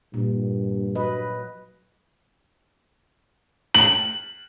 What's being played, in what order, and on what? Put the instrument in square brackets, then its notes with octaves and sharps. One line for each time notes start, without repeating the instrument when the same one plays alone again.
[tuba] G2 [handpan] A#2
[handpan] F#3 B4 D#5
[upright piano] F#7